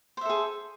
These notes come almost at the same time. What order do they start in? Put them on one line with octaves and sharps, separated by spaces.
C5 E5 A4 G#4